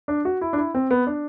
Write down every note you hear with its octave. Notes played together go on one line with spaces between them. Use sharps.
D4
F#4
E4
D4
E4
C4
B3
D4